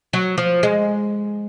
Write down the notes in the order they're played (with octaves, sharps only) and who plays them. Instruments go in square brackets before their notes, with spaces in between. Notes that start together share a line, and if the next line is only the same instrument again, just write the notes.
[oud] F#3
F3
G#3